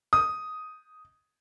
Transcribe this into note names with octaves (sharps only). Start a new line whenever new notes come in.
D#6